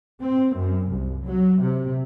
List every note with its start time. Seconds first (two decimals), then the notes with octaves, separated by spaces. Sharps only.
0.21 C4
0.55 F#2
0.88 C2
1.25 F#3
1.60 C3